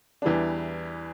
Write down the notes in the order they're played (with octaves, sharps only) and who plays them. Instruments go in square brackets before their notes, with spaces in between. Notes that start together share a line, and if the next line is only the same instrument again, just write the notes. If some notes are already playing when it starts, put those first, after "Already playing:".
[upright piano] E2 E3 G3 D4